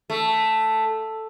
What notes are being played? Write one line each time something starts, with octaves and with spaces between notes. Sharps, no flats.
A3